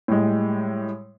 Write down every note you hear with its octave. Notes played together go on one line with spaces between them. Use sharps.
A2 G3 G#3